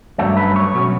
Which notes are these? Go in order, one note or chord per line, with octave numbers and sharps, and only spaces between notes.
G2 F#3 A3 C#4 A4
B4
C#5
B2 F#3 C#4